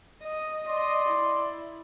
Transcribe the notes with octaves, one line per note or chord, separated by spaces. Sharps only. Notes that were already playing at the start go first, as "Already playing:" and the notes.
D#5
D5 D#5 C6
E4